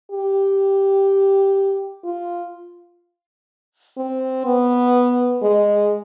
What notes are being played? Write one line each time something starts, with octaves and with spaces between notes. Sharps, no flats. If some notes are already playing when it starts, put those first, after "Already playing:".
G4
F4
C4
B3
G#3